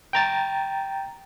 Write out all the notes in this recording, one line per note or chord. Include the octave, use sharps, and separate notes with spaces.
G5 A#5 A6